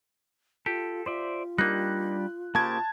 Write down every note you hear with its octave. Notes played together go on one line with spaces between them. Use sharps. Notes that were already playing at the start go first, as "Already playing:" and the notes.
F4 G4 A4
F4 C5 D5 E5
G3 A#3 D4 D#4 G4 F#6
C#3 A#3 G4 C5 A5 G#6